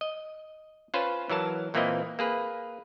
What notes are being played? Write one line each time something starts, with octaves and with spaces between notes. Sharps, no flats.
D#5
C#4 F4 B4 C5
E3 F#3 A#4 A5
A#2 E3 A#3 C4 E4 D#5
A#3 G#4 B4